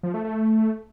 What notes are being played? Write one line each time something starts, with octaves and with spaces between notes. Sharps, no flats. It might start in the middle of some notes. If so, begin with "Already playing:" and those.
F3
A3
A3